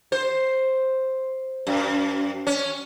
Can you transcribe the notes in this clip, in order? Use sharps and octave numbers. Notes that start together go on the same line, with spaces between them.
C5
F#2
C#4